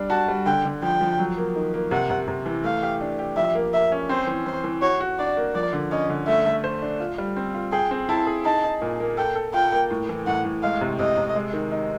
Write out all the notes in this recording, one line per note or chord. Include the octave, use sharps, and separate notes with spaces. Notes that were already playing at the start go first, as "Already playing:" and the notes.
Already playing: G3 D4
F#4 A5
G3
D3 G5
D3
F3 G5
F3
F#3
A#3
D#3
A#3
C3 F#5
C3
C3
E3
A3 F5
G4
D4
G4
F3 E5
A#3
A#3 E5
C#4
C4 C5
E3
E3 C5
E3
F#4 C#5
F#4
D4 D5
A#3
F3 D5
D3
C#4 D#5
D3
A3 E5
A3
C5
D4
F4
G3
C4
F4
G#4 G5
C4
E4 A5
G#4
D#4 A5
D#4
A#2
A#3
A4 G5
A4
F4 G5
A#3
A2
E3
A2 F#5
A2
G#3 F5
C3
C3 D#5
C3
G#3
D#3
D#4